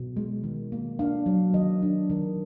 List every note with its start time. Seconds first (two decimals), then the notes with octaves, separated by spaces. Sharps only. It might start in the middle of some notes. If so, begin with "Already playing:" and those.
Already playing: B2
0.17 G#3
0.44 D#3
0.72 A#3
0.99 D4 F5
1.26 F#3
1.54 D#3 D#5
1.82 D4
2.10 D#3